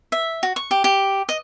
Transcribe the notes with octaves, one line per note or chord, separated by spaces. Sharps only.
E5
F#4
C#6
G4
G4
D#5